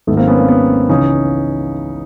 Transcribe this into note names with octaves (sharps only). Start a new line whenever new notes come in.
G#1 G#2 D#3 F#3 A3 B3
A#3 C4
B3 C#4
A#3 C4
B3 C#4
C#2 C#3 E3 C#4 D#4